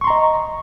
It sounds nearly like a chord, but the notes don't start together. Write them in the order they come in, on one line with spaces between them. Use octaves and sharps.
C#6 C6 A#5 D#5